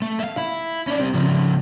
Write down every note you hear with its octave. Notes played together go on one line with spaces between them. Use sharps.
A3
E5 F5
E4
C#4 D5
G3 C4
C#3 F3